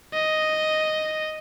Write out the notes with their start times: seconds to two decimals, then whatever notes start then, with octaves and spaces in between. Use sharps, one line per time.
0.13 D#5